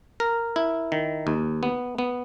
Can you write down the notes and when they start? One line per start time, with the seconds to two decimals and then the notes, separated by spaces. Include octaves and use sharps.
0.20 A#4
0.56 E4
0.92 D#3
1.27 D#2
1.63 B3
1.98 B3